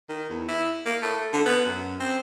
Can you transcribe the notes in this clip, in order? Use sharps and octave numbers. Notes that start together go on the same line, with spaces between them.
D#3
E2
E4
A#3
A3
D3
B3
F#2
C4